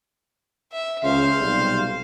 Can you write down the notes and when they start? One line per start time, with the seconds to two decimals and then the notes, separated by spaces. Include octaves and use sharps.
0.72 E5
1.04 C#2 C#3 C5 F5
1.40 B1 C3 G3